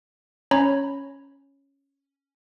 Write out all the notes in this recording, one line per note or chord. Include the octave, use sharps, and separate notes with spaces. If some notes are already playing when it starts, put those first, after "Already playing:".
C#4 C#5 A#5 B5